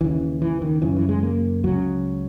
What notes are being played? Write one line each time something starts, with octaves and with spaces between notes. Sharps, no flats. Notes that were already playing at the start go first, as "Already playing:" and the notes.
D#2 C#3 E3
E3
D#3
F#2 C#3 E3
E3
G#3
A#3
C#2 C#3 F#3